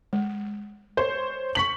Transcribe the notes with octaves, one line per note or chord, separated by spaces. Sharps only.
G#3
C5 C#5
C#6 B6 F#7